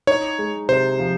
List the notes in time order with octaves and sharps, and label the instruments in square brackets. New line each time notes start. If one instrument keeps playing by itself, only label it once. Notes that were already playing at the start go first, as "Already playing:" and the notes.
[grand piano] D#4 [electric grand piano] C#5
[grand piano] G#3
[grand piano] C3 [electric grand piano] C5
[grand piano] F3